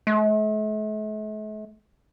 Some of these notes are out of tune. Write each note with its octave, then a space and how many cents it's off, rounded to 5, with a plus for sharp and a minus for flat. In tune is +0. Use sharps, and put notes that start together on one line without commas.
A3 -45